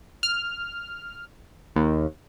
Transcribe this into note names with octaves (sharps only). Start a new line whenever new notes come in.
F6
D#2